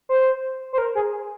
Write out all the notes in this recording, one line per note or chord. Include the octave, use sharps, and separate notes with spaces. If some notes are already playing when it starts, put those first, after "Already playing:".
C5
C5
A#4
G#4